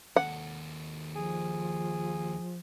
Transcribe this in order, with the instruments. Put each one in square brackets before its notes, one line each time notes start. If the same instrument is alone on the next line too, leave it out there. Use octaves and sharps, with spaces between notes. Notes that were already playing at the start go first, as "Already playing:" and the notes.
[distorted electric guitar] D#2 A4 [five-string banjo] F#5
[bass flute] F3 [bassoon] G#4